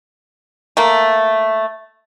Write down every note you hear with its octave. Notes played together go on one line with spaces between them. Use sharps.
A3 A#3